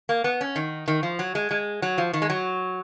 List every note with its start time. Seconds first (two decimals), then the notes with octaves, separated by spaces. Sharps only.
0.09 A#3
0.24 B3
0.41 C#4
0.56 D#3
0.88 D#3
1.03 F3
1.19 F#3
1.35 G#3
1.51 G#3
1.82 F#3
1.98 F3
2.13 D#3
2.22 G#3
2.30 F#3